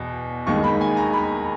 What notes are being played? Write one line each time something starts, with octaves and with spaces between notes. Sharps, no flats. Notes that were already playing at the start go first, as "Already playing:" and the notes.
Already playing: E2 B2
D#2 D#3 G#3 C#6
B5
G#5
A#5
B5